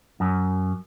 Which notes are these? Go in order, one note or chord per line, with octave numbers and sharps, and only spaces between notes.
F#2